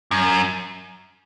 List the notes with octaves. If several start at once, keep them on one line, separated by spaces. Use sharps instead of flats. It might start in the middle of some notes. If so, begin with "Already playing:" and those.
F#2